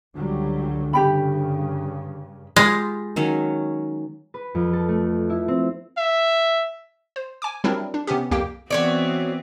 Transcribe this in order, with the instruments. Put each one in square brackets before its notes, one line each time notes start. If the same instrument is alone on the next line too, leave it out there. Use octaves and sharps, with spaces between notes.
[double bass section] C#2 F#3 G3 [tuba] D3
[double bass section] G2 C#3 [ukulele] G4 G5 B5
[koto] G#3 [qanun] F4 G4 B5
[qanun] D#3 F#3 C#4
[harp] B4
F2
A4
A3
E4
C4
[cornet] E5
[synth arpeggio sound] C5
G#5 D6
F#3 G3 C4 D4 E4 A#4
D4
C3 B3 C#4 G4
C2 F2 A#3 G4 G5
[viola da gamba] E3 B3 C4 [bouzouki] F#4 C#5 D5